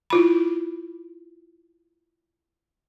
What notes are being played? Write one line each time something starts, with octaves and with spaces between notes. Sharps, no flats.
E4 F4 B5